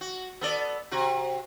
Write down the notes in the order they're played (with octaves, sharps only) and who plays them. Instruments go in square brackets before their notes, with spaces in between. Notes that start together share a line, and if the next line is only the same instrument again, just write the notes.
[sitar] F#4
B3 A4 D5
C3 F#4